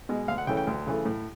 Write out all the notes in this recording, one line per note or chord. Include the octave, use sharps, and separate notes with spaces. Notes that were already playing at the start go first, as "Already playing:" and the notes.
B2 G#3
D2 F5
F#5
C#3 E3 A3 C#4 G5
G5
D2
C#3 E3 A3
A2